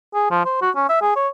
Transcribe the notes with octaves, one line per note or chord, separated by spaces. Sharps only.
G#4
F3
C5
F#4
C#4
E5
G#4
C#5